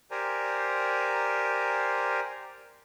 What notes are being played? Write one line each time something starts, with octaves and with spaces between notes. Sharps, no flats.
G4 A#4 C5 D5 G#5 A#5